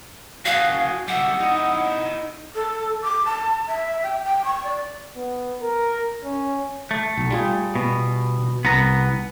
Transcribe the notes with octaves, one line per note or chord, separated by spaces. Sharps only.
F#4 G#4 F5
G3 E5 F#5
D#4 E4
A4
D6
A5
E5
G5
G5
C#6
D5
B3
A#4
C#4
A3
B1
G3 F4 G#4
B2
C2 B3 A#5